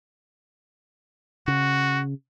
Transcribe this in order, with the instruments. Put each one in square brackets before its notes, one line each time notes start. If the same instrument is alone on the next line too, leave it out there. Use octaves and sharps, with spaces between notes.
[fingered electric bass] C#3 [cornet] F#4